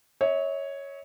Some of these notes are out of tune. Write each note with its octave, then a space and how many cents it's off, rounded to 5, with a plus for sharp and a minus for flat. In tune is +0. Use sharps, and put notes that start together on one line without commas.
C#5 +0 E5 -45